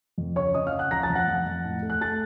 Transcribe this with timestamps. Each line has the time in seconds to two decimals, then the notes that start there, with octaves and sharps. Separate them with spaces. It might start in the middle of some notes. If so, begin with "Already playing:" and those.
0.18 F2
0.36 C#3 C#5 C#6
0.54 C#3 D#5 D#6
0.67 F5 F6
0.72 C#3
0.79 F#5 F#6
0.91 F3 A#5 A#6
1.03 A5 A6
1.10 F2
1.15 F#5 F#6
1.28 F2
1.46 F2
1.64 A2
1.83 A3
1.90 F#6
2.01 A3 A5 A6